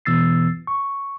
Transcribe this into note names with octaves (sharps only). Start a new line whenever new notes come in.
B2 E3 B3 E6 A6 C7
C#6